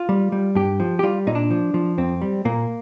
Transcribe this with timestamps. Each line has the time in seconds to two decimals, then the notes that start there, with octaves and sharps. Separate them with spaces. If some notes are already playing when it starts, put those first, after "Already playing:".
Already playing: F4
0.09 G3
0.32 G3
0.55 G2 G4
0.80 F3
0.99 G4
1.03 G3 F4
1.27 A#2 D#4
1.35 D4
1.50 F3
1.74 F3
1.98 F2 C4
2.22 G3
2.45 A#2 A#3